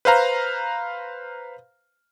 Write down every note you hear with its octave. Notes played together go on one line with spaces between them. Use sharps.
B4 C5 F5 A#5